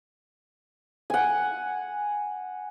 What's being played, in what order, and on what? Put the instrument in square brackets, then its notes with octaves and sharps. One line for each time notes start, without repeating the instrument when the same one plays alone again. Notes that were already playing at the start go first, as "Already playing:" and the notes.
[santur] F#5 G#5